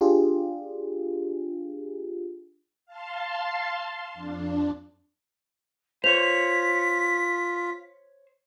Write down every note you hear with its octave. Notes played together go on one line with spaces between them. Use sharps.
D4 F4 G4 G#4
F5 A5 C6
F2 D4
F4 C5 C#5 B6 F7